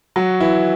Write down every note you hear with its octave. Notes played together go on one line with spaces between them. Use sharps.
F#3 F#4
E3 E4